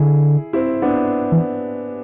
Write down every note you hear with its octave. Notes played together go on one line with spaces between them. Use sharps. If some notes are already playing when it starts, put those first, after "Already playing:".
Already playing: D3 E4 G#4
C4 E4
B3 D4
E3